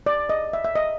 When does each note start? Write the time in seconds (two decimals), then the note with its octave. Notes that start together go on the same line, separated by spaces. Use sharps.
0.06 D5
0.30 D#5
0.53 E5
0.64 E5
0.76 D#5